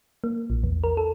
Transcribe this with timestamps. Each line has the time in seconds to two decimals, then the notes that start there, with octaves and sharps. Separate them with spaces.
0.24 A#3
0.50 A#1
0.63 E2
0.84 A#4
0.97 A4